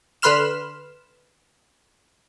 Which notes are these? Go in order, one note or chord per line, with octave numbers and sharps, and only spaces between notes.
D3 B4 B5 C6 F6 E7